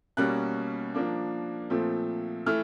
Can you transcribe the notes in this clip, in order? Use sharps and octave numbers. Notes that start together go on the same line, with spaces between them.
B2 G3 A#3 C#4 F#6
F3 A#3 D4
A#2 F3 A3 C4
E3 A3 F6